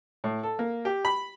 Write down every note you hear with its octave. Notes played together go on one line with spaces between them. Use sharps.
A2
A4
A#3
G4
B5